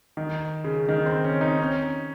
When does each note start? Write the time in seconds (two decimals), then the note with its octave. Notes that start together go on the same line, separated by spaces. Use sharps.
0.17 D#3
0.64 C#3
0.89 D#3
1.06 C4
1.24 C#4
1.41 D#4
1.59 C#4